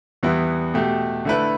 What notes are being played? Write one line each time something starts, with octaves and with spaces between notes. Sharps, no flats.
E2 E3 G3 B3 E4
B2 A3 G4
D3 A3 E4 B4